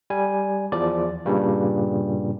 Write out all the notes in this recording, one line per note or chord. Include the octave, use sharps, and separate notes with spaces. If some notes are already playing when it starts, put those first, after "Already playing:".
G3 G#5
E2 F3 D5
G2 A#2 C#3 G3